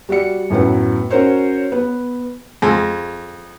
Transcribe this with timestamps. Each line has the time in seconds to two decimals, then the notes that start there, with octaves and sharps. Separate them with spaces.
0.09 G3 F#4 D5 C#7
0.50 F#2 A2 F#3 B3
1.10 C#4 F#4 A#4 C5 C#5
1.72 B3
2.62 F2 G#3